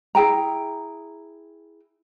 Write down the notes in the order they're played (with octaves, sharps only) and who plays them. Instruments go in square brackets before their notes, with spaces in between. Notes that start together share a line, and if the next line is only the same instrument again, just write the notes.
[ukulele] E4 G#4 G5 A#5